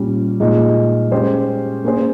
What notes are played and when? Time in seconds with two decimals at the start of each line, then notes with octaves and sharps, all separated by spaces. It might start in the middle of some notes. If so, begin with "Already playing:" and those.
Already playing: A#2 G3 C#4 G4
0.40 A#2 G#3 D#4
1.12 G#3 C#4 G4 C5
1.84 A#3 C#4 G#4 C5